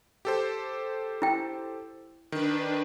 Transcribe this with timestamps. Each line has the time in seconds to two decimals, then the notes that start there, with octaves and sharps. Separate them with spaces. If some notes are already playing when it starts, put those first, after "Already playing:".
0.25 G4 A4 C5
1.22 E4 G5
2.32 D#3 D4 B4